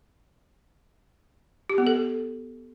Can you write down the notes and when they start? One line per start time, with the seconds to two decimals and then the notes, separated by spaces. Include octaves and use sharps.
1.70 G4
1.78 B3
1.87 A4